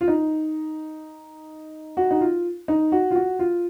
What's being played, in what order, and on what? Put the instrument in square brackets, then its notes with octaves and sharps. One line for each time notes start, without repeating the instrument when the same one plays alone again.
[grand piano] F4
D#4
F#4
D#4
F4
D#4
F#4
F4
F#4
F4